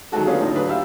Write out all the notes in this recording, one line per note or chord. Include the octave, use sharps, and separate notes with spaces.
D#3 F#3 G#3 A3 F#4 A4
B3 C#4 D4 F4 G4 G#4
A2 D3 D#4
F#3 D4 F4 G#4 B4
G4 E5 F5